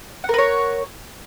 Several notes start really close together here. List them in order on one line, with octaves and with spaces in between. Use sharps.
F#5 A#4 B4 C#5